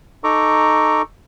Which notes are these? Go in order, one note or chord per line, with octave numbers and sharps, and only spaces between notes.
D#4 A4 A#5 C#6 D6